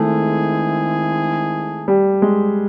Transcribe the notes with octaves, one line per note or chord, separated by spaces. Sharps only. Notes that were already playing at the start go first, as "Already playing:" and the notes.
Already playing: D#3 G#3 A3 C4 E4 G#4
G3
G#3